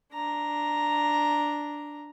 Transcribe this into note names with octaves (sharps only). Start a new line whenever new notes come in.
D4 A#5